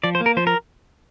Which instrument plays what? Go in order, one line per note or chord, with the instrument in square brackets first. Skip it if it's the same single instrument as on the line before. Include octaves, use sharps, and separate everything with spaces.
[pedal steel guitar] F3 D5
C5
A#3
A#4
F3 C5
A#4